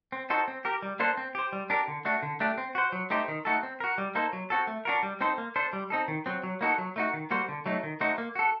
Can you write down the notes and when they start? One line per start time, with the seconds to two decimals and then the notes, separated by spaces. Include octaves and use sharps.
0.12 C4
0.30 D#4 F#4 A4 C5
0.48 C4
0.65 G4 A#4
0.82 G3
1.00 A#3 D4 A4 C5
1.17 C4
1.35 G4 C5
1.53 G3
1.70 D4 G4 A#4
1.88 D3
2.05 A3 D4 F#4
2.23 D3
2.40 A3 D4 G4
2.58 C4
2.75 F#4 C5
2.92 F#3
3.10 A3 D#4 G4 C5
3.28 D#3
3.45 A3 D#4 F#4 A4
3.63 C4
3.80 F#4 A#4
3.98 G3
4.15 A#3 D#4 A4 C5
4.33 F#3
4.50 C4 F#4 A4
4.67 A3
4.85 D4 F#4 A#4
5.03 G3
5.21 C4 D#4 A4 C5
5.38 A#3
5.56 D4 A4 C5
5.73 G3
5.90 C4 D#4 A4
6.08 D#3
6.26 F#3 C4
6.43 F#3
6.61 A#3 D#4 F#4 A4
6.78 F#3
6.96 A3 D#4 F#4
7.14 D#3
7.31 G3 A#3 F#4 C5
7.49 D3
7.66 F#3 A3 D#4
7.83 D#3
8.00 A3 D#4 F#4 C5
8.18 A#3
8.35 F#4 A4